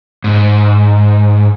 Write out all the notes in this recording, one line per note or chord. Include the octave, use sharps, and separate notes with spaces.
G#2